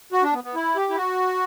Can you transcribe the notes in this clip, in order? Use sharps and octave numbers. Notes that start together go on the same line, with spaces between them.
F#4
D4
B3
B3
E4
G4
E4
F#4